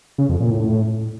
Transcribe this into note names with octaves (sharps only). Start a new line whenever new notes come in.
C#3
F2
A#2
A2